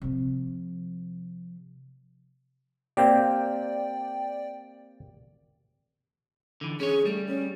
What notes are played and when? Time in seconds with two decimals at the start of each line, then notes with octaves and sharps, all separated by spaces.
0.02 C3 F3
2.97 A#3 C4 G4 D5 G5
6.61 D3 E3
6.80 C#4 G#4 C#5
7.05 G3 A3
7.27 C#4